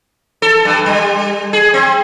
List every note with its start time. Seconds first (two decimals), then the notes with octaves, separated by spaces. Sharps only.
0.42 A4
0.65 G2
0.86 G3
1.53 G#4
1.74 C4